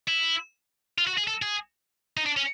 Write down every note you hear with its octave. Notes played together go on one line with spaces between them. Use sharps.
E4
F4
F#4
G#4
A4
G#4
D#4
D4
C#4